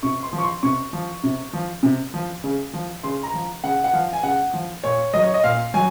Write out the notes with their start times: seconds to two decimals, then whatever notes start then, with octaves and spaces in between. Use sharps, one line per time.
0.03 C3 C#6
0.23 C6
0.33 F3
0.38 C#6
0.43 C6
0.63 C3 C#6
0.93 F3
1.23 C3
1.53 F3
1.83 C3
2.14 F3
2.44 C#3
2.74 F3
3.03 C#3 C6
3.23 A#5
3.34 F3
3.64 C#3 F#5
3.84 F#5
3.93 F3 F5
4.13 G#5
4.23 C#3 F#5
4.54 F3
4.83 A#2 C#5
5.13 F#3 D#5
5.24 C#5
5.34 D#5
5.44 A#2 F5
5.74 F#3 G#5